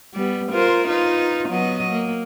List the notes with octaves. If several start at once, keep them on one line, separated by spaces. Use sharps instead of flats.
G3 B3
F4 A#4 C5
D#4 F4 B4
F#3 B3 D#5
A#3